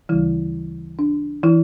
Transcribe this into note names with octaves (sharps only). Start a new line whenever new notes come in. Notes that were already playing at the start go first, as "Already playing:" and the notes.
D2 C#3 E3 G3 E4
D4
E3 E4